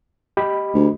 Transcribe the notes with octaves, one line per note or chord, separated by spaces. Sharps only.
G4 D#5 B5
D2